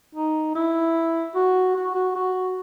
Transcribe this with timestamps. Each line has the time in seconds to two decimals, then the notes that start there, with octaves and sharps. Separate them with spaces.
0.15 D#4
0.55 E4
1.35 F#4
1.75 F#4
1.95 F#4
2.15 F#4